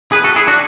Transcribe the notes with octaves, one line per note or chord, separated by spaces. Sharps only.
G#4 B4
F#4 A4
E4 G#4
D4 F#4